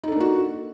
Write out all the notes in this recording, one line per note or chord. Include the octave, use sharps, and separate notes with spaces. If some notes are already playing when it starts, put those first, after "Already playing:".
A#3 D4 D#4 F#4 A4